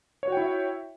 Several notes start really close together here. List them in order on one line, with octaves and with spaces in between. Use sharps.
C#5 F#4 G5 E4 E5